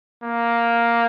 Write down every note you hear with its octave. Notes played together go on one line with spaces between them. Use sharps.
A#3